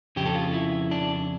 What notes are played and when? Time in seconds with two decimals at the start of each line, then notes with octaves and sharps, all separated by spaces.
0.16 F2 C#3 G4
0.26 A4
0.35 F4
0.53 E4
0.91 D4